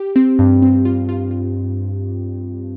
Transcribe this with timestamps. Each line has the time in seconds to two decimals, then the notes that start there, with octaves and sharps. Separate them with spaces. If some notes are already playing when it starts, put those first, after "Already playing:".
Already playing: G4
0.16 C4
0.39 G2
0.62 C4
0.85 F4
1.09 F4
1.31 F4